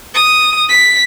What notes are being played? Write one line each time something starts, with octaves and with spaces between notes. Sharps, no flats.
D#6
B6